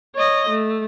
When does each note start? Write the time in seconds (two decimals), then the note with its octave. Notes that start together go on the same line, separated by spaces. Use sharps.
0.15 C#5 D#5
0.49 A3